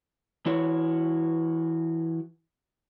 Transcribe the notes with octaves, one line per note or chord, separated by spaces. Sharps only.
E3 E4 F#4 C#5